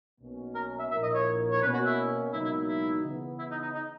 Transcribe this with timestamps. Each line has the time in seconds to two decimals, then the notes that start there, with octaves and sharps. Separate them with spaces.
0.20 B1 B2 A#3 C#4
0.55 A#4
0.79 E5
0.90 A#1 A#2 A#3 E4 A#4 E5
1.03 D#5
1.14 C#5
1.52 C#5
1.62 B2 A#3 C#4 B4
1.73 F#4
1.86 E4
2.33 C#2 B2 F#3 A#3 D#4 E4
2.45 E4
2.68 E4
3.03 C#3 E3 B3
3.39 E4
3.51 D#4
3.62 D#4
3.75 D#4